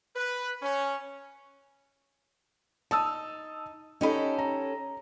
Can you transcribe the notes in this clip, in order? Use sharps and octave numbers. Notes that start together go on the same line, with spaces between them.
B4
C#4
D#4 A5 D#6 E6
C#4 D#4 G4 A4 D#5 B5
A#5